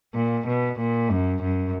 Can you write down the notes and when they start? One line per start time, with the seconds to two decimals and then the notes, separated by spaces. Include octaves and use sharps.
0.15 A#2
0.47 B2
0.79 A#2
1.11 F#2
1.43 F#2